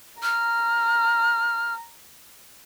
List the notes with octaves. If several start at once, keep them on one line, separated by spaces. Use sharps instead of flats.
A#5 F6